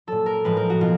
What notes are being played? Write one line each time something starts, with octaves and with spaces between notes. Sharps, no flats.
A#2 F#3 A4
A#4
A2 F3 G#3 B4
A#4
F#4
B2 F4